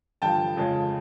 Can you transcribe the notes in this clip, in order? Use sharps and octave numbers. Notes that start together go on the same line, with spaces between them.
G2 D3 F3 G5 A5
F2 C#3 F3 G#3